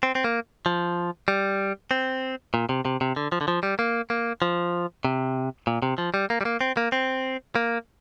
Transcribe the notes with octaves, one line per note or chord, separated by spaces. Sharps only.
C4
C4
A#3
F3
G3
C4
A#2
C3
C3
C3
D3
F3
D3
F3
G3
A#3
A#3
F3
C3
A#2
C3
F3
G3
A#3
G3
A#3
C4
A#3
C4
A#3